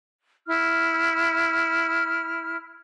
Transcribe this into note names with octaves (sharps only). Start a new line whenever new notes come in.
E4 F6